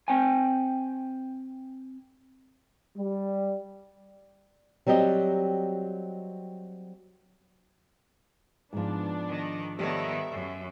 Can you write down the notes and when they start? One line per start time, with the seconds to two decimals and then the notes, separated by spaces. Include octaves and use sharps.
0.08 C4 C5 G5 G#5
2.98 G3
4.87 F#3 G3 C4 G4 D#5
8.73 G#2 F3 B3 D4
9.29 D#3
9.79 D#3 G3 B3 A4 C#5 E5
10.31 F#2